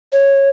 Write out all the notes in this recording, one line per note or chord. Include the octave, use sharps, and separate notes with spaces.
C#5